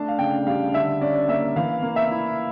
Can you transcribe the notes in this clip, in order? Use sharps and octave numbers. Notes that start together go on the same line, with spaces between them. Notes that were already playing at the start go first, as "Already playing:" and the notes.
Already playing: A3 D4 A5
F5
C#3 G5
G3 F5
D3 E5
C#4 D5
A#3 E5
E3 F5
A#3
E5
E4